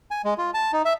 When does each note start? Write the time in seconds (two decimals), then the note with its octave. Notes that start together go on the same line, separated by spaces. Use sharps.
0.11 G#5
0.25 G#3
0.38 F4
0.54 A5
0.73 D#4
0.85 E5